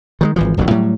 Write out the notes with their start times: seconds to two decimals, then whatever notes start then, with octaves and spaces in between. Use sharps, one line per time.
0.21 D#3 F#3 G#3
0.36 G#1 E3 F3
0.57 D#1 A1 D2 F#3
0.71 A2 F#3 G3